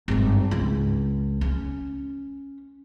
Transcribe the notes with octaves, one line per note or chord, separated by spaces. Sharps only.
G#1 G2
C#2
C#4